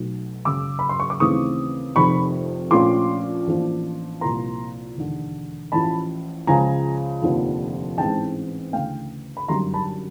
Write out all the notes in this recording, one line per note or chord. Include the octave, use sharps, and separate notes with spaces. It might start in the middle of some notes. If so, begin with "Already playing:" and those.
Already playing: B1 B2 F#3 A3
F#1 F#2 C#3 D6 E6
B5
C6
C#6
D6
D#2 C#3 E3 A3 C4 C#6 D#6
F1 F2 C3 D#3 B5 C#6
A#1 A#2 F3 A3 C#4 C6 D6
A1 A2 F3 A#3 D4
C2 A#2 F3 A#3 A#5 C6
E1 D#2 D3
A1 A2 F3 A5 B5
C#2 C#3 F3 G#3 G#5 A#5
F1 D#2 D3 F3 A#3
A1 G#2 E3 G#3 C4 G5 A5
D2 C#3 E3 A3 F5 G5
B5
G1 F#2 D#3 G3 A#5 C6
A5 B5